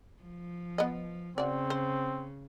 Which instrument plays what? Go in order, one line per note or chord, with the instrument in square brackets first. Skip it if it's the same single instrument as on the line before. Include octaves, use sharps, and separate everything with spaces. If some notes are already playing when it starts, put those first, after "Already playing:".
[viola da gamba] F3
[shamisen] B3 D#5
[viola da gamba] C#3 [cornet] C4 [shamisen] F#4 D5
[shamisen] C5